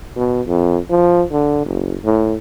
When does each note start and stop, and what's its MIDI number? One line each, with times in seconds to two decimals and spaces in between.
0.16 0.42 47
0.46 0.78 41
0.90 1.23 53
1.31 1.64 50
1.65 1.96 30
2.05 2.35 45